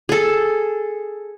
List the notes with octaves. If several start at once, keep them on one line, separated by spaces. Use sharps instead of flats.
G#4 A4